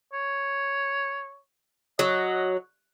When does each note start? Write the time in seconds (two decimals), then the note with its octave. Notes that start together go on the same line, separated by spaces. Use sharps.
0.13 C#5
1.99 F#3 D#5